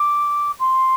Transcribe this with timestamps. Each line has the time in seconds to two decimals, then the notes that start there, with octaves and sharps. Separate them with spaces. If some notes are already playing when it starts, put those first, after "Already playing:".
Already playing: D6
0.60 C6